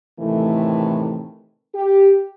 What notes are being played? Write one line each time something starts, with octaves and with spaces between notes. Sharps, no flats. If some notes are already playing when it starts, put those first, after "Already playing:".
A2 C3 D#3 E3 A3
G4